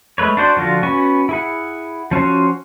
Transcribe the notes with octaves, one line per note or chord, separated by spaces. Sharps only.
G#3 A3 B4 C#5
D4 F#4 C5 D5
D3 F3 F4 F#4
B3 C#4 F#4 G#5 C#6
E4 G#4 F#5
F3 C#4 F#4 C5